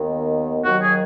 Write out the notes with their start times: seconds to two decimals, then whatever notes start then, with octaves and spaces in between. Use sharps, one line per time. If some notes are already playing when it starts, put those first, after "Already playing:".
Already playing: D#2 D#3 B3
0.64 D#2 D#3 F#3 F#4
0.82 G#4